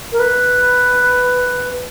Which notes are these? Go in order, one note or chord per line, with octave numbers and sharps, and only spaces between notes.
A#4
B4